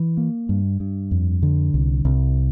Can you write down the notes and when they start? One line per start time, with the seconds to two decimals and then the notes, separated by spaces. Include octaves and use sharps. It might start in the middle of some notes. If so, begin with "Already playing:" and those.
Already playing: E3
0.17 A#3
0.49 G2
0.80 G2
1.11 F2
1.42 D3
1.74 C2
2.05 C2